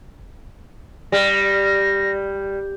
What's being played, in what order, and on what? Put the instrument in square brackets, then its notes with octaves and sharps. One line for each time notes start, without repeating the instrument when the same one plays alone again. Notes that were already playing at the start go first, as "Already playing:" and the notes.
[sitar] G3 [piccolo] A#6